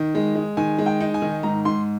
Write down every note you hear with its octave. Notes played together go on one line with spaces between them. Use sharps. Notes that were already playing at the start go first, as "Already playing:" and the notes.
Already playing: D#3
G#3
G#3
D#3 G#5
G#3
G5
D#4
G#5
D#3
G#2 A#5
G#2 C6